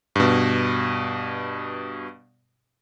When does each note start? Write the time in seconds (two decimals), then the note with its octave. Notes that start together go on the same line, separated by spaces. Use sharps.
0.16 G2 B2